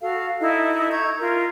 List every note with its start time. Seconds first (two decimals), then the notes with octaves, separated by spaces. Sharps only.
0.01 F#4 A4 F5
0.40 D#4 E4 A4 D#5
0.90 A#5 C#6 G6 G#6
1.18 F4 A#4